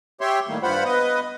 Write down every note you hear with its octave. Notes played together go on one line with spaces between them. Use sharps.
G4 C#5 E5 C6
A2 D#3 G3 A3 A#3
G2 F4 C5 F#5 B5
B3 B4 D#5